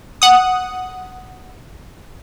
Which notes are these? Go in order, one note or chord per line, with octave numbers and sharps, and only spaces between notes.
F#5 D#6